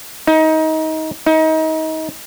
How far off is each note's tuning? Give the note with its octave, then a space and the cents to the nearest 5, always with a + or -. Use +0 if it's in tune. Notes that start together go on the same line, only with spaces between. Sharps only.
D#4 +25
D#4 +30